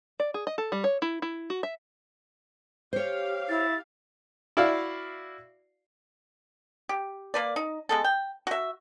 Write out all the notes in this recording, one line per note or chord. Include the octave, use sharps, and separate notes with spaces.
D5
G#4
D#5
A4
G3
C#5
E4
E4
F#4
E5
G4 C5 C#5 F5
E4 A6
E4 F#4 D5 E5 F5
G4
A#3 B4 D5
D#4
G#3 B3 A4
G5
F#4 E5